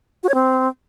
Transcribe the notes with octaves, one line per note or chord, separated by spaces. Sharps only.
F#4
C#5
C4